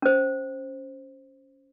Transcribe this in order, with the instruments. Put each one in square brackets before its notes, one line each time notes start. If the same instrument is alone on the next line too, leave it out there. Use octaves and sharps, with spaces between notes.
[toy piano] C#4 C5